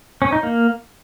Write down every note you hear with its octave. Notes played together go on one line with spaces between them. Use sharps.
C#4
D#4
A#3